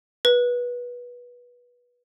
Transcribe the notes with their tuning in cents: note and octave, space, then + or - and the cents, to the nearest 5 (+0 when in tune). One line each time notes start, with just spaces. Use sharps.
B4 -20